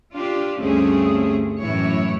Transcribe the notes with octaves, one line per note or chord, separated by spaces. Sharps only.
D4 F4 G4
D2 G2 A3 C4 C#4 G#4
F#2 A2 E3 E4 C#5